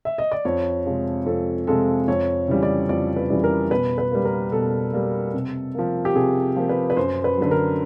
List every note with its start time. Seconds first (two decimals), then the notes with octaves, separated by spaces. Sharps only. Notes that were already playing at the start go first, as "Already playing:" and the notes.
0.05 E5
0.18 D#5
0.32 D5
0.45 F2 C#5
0.86 C3 F3 G#3
1.26 F2 A4
1.67 C3 F3 G#3 A4
2.08 F2 C#5
2.48 C#3 E3 G3
2.63 D5
2.89 F2 D5
3.16 B4
3.30 C#3 E3 G3
3.44 A#4
3.71 B2 B4
3.98 B4
4.11 G3 A#3
4.25 A#4
4.52 B2 A4
4.93 G3 A#3
5.34 C3
5.75 F3 A#3
6.05 G4
6.15 C3 G#4
6.56 F3 A#3
6.69 B4
6.90 B4
6.97 F#2 C5
7.24 B4
7.38 D3 F#3 B4
7.51 A#4